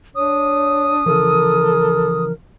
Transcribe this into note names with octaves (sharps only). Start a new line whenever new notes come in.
D4 C#5 D#6
C#3 E3 F3 A4 A#4